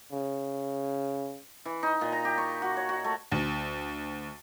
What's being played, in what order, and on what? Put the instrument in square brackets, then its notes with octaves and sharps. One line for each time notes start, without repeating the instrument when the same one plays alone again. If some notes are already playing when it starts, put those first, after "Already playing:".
[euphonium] C#3
[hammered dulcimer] E3
D#4
A#2
A#5
G4
C#6
F#4
C#5
F#4
A3
[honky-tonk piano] D2